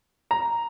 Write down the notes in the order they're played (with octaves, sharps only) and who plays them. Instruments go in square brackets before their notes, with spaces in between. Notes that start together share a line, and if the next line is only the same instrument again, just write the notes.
[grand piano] A#5